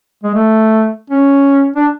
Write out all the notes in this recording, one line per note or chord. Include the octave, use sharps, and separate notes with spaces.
G#3
A3
C#4
D4